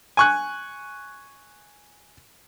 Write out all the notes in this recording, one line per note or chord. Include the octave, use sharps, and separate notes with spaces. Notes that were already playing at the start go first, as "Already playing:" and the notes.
G#5 C#6 F#6